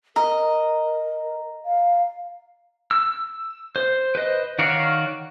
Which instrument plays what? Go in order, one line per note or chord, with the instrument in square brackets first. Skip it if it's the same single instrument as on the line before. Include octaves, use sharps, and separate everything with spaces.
[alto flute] A#4 [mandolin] D#5 [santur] A#5
[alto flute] F5
[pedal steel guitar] E6
C5
B4 C5 D#5
D#3 F#4 C#5 D5 F5